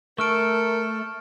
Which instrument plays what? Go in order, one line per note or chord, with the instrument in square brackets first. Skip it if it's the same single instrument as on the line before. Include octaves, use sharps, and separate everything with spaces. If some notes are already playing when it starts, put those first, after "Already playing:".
[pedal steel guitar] A3 [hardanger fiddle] A4 [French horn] A#4 [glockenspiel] C#6 F6 D7